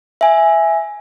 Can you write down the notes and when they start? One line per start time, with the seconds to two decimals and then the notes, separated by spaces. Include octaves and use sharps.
0.21 E5 G#5